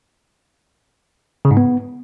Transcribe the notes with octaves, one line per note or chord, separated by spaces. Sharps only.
C#3
G#2
B3